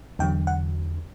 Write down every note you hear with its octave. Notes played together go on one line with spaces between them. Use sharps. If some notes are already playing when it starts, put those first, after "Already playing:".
E2 D3 F#3 G5
F#5